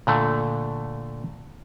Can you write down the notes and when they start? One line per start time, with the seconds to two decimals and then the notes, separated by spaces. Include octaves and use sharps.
0.07 A#2 D3 A3